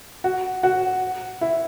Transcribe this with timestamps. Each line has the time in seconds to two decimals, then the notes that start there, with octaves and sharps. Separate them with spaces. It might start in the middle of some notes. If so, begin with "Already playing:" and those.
0.24 F#4
0.63 F#4
1.41 E4